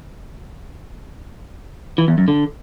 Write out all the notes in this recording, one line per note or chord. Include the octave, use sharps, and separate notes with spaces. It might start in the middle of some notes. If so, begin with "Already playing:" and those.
E3
E2
F#2
D3